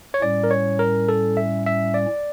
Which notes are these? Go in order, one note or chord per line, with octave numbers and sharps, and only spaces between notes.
C#5
A2 G3 C#4 D5
A#4
C#5
A#4
A4
E5
E5
D5